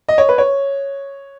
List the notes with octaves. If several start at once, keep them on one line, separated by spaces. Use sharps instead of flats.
D#5
C#5
B4
C#5